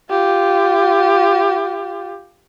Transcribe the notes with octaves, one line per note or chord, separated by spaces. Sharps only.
F4 G4